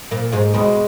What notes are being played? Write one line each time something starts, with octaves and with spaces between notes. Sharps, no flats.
A#2 A#3
G#2 G#3
B2 G#3 B3